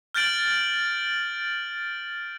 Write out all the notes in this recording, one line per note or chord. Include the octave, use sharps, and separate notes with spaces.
F6 G6 A6 D7 F#7